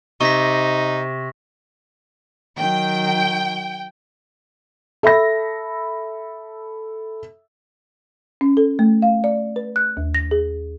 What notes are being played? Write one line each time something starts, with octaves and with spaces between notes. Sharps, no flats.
C3 D#4 C#6 A#6 B6
D#3 F#3 G5
A4 E5 B5 A#6
C#4
A4
A3
F5
D5
B4
F#6
D#2
A#6
G#4